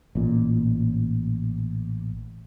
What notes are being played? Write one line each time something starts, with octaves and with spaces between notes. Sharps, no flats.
A1 A#2